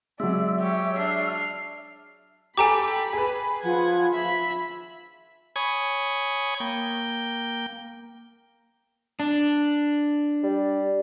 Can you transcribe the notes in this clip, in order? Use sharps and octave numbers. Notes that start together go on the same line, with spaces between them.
F#3 G#3 D5 E5
G4 C#5
D4 F6 C7
G4 A4 G#5 A#5 B5 D6
G#4 B4
F3 F#5 G#6
E5 B5
C#5 G#5 B5 C#6 D#6 G#6
A#3 G5
D4
G3